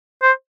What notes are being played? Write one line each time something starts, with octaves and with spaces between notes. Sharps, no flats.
C5